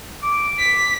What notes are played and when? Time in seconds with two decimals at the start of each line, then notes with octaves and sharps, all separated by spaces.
0.23 D6
0.59 B6